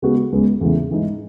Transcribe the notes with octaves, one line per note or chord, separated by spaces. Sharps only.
C#3 G#3 B3 F#4
C#2 C#3 G#3 B3
E2 C#3 E3 A3
G#2 E3 G#3 D#4